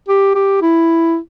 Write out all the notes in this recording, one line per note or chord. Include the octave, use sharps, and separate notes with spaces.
G4
G4
E4